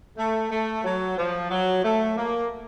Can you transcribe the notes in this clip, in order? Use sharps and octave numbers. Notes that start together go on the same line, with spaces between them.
A3
A3
F#3
F3
F#3
A3
A#3